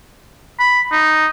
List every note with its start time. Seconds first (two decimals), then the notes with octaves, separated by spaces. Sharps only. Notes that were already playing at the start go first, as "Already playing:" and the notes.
0.59 B5
0.92 D#4